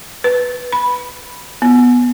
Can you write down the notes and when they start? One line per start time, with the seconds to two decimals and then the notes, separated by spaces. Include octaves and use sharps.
0.24 B4
0.72 B5
1.62 B3